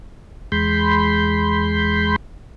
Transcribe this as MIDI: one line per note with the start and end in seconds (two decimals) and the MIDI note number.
0.52 2.16 40
0.52 2.16 56
0.52 2.16 83
0.52 2.16 84
0.52 2.16 91